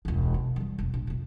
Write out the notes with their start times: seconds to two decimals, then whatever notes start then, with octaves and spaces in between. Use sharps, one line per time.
0.05 E1 C#2
0.34 B2
0.56 E3 G3
0.79 E1 C4
0.94 A#1
1.07 F2 C3